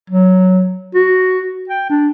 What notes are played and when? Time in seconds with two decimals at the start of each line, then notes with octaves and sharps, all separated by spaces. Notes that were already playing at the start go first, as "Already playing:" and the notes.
0.10 F#3
0.95 F#4
1.69 G5
1.90 D4